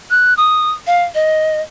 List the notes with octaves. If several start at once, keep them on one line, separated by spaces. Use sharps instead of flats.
F#6
D#6
F5
D#5